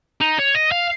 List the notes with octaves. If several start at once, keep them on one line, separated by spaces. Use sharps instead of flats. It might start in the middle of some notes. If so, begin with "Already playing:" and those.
D#4
C#5
D#5
F5